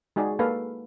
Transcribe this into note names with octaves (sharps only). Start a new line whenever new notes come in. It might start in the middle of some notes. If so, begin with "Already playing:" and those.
G#3 D#4 F#4 G#4 D5
A#3 A4 B4 F5